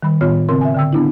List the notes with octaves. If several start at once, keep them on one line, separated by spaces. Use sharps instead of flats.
D#3 G3 B5
A2 D#3 B3 F4 C#5 F6
C#3 C4 A#4 C6
E5 G#5
D3 G5 E6
B3 D4 E4